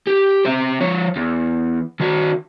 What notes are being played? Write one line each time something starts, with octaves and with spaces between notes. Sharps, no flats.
G4
C4 E5
F3 C#5
E2
D#3 F#4